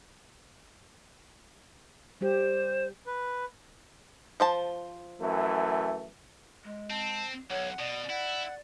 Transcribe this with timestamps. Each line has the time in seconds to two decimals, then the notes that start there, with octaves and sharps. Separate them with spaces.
2.21 G3 G4 C5
3.07 B4
4.40 F3 C5 A5
5.21 F#2 E3 A3
6.64 G#3
6.90 C4 A5
7.50 B1 C#5 F#5
7.79 B2 D5
8.09 E4 F#5